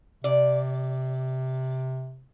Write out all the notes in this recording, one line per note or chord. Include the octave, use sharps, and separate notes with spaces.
C3 D5